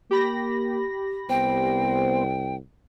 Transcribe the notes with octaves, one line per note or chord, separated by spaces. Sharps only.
A#3 G4 B5 A#6
C2 B3 C5 G5